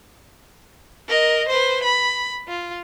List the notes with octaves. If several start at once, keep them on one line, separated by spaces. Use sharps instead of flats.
A#4 D#5
B4 C5
B5
F4